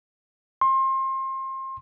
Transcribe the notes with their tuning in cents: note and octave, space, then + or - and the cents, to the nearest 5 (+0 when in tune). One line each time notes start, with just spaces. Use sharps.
C6 +30